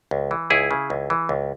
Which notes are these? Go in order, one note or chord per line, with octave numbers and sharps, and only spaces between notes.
C#2
E3
C#2 E4 G#4
C#3
C#2
E3
C#2